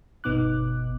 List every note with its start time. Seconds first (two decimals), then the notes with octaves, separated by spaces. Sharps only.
0.24 G1 B2 B3 D#4 D6 F#6